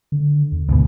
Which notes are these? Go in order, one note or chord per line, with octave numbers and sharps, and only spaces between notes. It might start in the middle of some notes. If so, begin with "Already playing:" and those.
D3
E2
D2 G#2 B2 D3